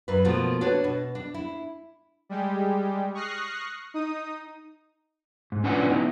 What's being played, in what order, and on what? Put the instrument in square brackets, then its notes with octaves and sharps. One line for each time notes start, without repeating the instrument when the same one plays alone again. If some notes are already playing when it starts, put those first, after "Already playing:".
[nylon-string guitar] F#2 B4
B2 F3 A3 A#3
D4 F#4 A4 B4 C#5
B2
D4
E4
[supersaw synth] G3 G#3 G4
C#6 D#6 F6 F#6 A#6 C7
D#4 D#6
[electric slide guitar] G#2
C#4 D4 F4 B4 D5 F#5
B3 D#4 E4